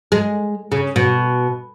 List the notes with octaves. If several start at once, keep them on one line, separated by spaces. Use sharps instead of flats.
G#3
C#3
B2